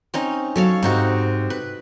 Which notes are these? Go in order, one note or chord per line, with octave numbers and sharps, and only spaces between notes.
C4 C#4 D#4
F#3 A4 C#5 F5
G#2 C3 D#4 F#4
B4